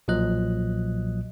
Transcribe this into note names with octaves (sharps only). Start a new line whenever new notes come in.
B1 A#2 F3 F#3 D#5 F#6